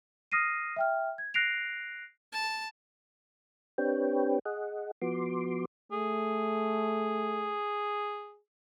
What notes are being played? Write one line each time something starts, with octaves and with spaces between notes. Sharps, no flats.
D#6 F6 A#6 C7 D#7
E5 G5 F6
G#6
F#6 A#6 C7 D7 F7
A5
C4 D4 G4 B4 C#5 G5
G#4 D#5 F#5
F3 B3 F#4 C6 D6
A3 G#4